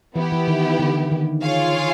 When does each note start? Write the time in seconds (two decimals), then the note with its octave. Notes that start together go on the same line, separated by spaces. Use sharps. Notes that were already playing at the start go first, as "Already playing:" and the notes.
0.16 E3 B3 E4 G4
0.32 E3
0.48 D#3
0.79 D3
1.11 D#3
1.43 F4 G#4 C#5 F5